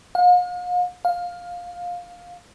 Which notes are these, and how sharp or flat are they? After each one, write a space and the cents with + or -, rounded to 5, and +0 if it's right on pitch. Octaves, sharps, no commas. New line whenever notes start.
F5 +45
F5 +15